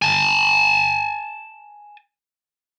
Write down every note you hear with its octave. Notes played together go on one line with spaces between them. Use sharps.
G#5 A5